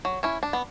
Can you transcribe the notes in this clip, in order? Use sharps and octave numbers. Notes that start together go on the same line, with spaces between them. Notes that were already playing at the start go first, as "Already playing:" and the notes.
F#3
C#4 E4
D4
B3